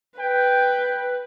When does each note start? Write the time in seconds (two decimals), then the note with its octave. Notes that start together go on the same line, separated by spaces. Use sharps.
0.19 B4 G5